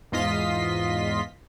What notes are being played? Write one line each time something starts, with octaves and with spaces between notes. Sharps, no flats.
E2 G#2 F4 D#5 C6 B6